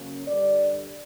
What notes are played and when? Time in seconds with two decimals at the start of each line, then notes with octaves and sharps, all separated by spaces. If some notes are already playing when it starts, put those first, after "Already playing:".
Already playing: C#3 F#3 A#3 C#4
0.26 G2 D3 G3 D5